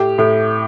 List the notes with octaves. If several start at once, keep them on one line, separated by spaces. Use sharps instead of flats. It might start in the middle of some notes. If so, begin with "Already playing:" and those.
Already playing: A2 G4
A2